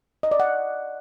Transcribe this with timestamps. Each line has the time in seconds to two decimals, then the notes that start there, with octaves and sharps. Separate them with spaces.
0.23 D#5
0.31 D5
0.40 F#5